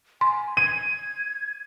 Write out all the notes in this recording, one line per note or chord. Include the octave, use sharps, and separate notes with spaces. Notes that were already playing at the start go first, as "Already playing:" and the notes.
G#5 C6
G#6 D#7